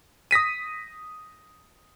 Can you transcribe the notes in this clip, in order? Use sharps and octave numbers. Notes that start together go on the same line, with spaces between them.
D#6 A#6 B6 D#7